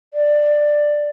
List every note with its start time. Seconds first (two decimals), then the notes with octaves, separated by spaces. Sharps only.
0.14 D5